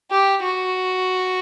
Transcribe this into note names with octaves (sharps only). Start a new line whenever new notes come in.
G4
F#4